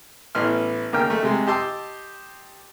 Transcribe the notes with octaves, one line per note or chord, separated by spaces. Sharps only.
A1 B3 E4 C6 F6
D#2 C#3 A#4 G5 F6
A3
C3 G#3 C6
G4 D#5 A5 C6 D6 E6